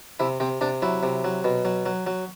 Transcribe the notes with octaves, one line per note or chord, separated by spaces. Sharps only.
C3 E4
C3 C4
C3 D4
F#3 E4
C3
F#3
B2
F#3
F#3
F#3